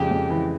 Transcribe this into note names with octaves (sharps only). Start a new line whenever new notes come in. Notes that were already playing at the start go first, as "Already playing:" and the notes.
Already playing: F2 C#3 G#3 G4
F2
E3